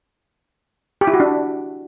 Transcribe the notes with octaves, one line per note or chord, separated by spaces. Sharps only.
G4
E4
F#4
D4